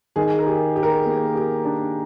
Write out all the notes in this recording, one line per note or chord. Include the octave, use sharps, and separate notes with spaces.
D#3 G#4
A#4
G4
G4
A#4
A#3
G4
D4